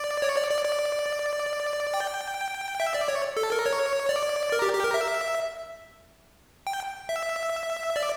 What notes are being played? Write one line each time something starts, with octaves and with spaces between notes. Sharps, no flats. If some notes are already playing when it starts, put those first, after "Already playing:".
Already playing: D5
C#5
D5
D5
D5
G5
E5
D5
C#5
A4
A#4
C#5
D5
A#4
G4
G4
A#4
E5
G5
E5
D5